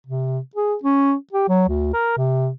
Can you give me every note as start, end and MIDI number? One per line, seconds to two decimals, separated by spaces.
0.07 0.39 48
0.56 0.74 68
0.84 1.13 61
1.33 1.47 67
1.49 1.66 54
1.69 1.91 38
1.94 2.15 70
2.17 2.50 48